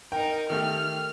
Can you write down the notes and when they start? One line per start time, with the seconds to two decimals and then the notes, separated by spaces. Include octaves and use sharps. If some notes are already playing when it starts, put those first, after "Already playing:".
0.12 D#4 A#4 G5
0.50 D#3 A3 G4 F6